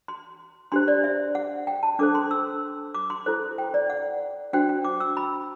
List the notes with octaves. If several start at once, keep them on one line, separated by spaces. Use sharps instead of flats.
C6
D4 G4 C5 C6
D5
E5
F#5
G5
A5
D4 A4 C5 D6
C6
E6
D6
C6
E4 A4 C5
G5
D5
F#5
D4 F#4 C5 G5
G5
D6
E6
B5